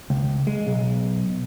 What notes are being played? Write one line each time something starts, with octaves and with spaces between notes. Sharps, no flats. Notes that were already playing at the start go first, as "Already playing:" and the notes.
C#2
G#3
B1